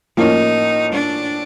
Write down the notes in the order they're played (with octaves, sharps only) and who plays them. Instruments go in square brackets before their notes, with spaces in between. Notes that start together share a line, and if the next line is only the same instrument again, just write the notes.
[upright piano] A2 F3 A#3 C#4 [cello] D#4
[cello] D4